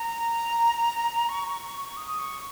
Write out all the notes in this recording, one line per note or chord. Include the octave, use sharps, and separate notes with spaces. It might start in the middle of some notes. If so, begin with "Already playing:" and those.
Already playing: A#5
C#6
D#6
C#6